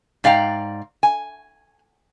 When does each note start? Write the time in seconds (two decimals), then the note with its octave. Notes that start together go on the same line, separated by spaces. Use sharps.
0.24 G#2 D5 F5 G5 A#5
1.03 G#5